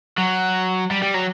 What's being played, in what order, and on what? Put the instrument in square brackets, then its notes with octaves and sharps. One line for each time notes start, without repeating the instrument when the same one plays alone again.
[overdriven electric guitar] F#3
G3
G3
F#3